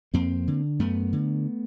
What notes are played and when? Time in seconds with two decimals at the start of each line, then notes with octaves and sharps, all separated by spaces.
0.14 F2 A#3 C4
0.47 D3
0.79 F#2 A3 B3
1.13 D3